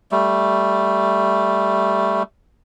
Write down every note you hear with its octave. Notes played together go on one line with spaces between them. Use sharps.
G3 A3